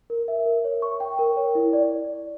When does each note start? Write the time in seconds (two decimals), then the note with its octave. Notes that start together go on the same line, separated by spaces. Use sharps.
0.10 A#4
0.28 E5
0.46 A#4
0.64 C#5
0.82 C#6
1.00 G5
1.19 A#4
1.36 C#5
1.55 E4
1.73 D5